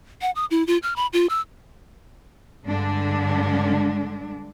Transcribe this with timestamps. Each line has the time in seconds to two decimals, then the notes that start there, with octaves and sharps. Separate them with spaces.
0.22 F#5
0.35 D#6
0.51 E4
0.67 F4
0.83 F6
0.96 B5
1.13 F4
1.29 E6
2.66 G2 D3 G#3 D4